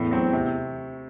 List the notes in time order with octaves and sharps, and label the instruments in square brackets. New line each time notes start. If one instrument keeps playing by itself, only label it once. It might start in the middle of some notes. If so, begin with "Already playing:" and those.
Already playing: [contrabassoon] E2 [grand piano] A2
[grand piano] F#3 C4
C3